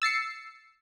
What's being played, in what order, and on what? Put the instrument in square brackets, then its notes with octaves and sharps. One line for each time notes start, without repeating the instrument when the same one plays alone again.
[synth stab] E6 A6 C7 C#7